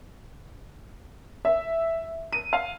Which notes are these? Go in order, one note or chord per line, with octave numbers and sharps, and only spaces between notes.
E5
D#7
F5